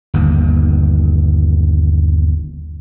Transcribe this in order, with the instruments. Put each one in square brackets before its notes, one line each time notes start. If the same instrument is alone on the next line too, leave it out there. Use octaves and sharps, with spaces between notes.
[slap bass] G1 D#2